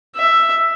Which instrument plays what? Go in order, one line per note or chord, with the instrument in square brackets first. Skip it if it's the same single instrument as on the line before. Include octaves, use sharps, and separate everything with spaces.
[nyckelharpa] E5